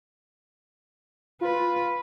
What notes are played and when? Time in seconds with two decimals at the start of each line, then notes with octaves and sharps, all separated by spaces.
1.41 F4 B4